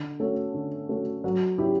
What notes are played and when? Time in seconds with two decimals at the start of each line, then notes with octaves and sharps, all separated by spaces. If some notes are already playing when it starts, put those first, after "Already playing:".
Already playing: D3
0.20 A3 C#4 F#4 A4
0.54 D3
0.89 A3 C#4 F#4 A4
1.24 F#3
1.58 C#4 E4 G4